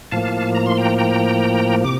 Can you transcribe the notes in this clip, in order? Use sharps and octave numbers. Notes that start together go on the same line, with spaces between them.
A2 F3 A#3 F5 A5
A#5
C6
G5 A#5
G5 A#5
C3 D6